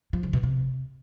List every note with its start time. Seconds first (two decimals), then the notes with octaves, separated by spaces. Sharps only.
0.13 F3
0.23 C#3
0.33 B2
0.43 C3